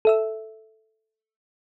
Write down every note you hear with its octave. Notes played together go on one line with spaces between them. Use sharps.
A4 E5 E6